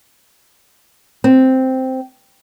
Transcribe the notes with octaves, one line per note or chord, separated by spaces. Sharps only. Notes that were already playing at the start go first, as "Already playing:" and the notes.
C4